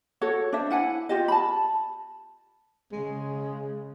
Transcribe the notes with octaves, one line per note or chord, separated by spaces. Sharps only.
F#4 A4 C#5 F#5
D4 C5 E5
E4 F#5 G#5
F4 G4 D#5
A5 B5
C#3 G#3